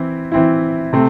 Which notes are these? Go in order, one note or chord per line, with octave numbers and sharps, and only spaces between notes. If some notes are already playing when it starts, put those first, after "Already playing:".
Already playing: E3 C4 E4
E3 C4 E4
C3 A3 C4